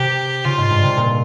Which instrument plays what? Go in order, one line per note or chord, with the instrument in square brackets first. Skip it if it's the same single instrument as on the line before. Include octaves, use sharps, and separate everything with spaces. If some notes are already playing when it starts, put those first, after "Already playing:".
Already playing: [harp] C3 [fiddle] G4
[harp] C#3 [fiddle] F4
[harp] G#2
G2
C3
A#2